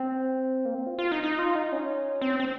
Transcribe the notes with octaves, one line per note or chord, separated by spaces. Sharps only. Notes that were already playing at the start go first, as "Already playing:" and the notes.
Already playing: C4
A#3
C4
F4
F4
D#4
D#4
F4
D#4
C#4
C4
C4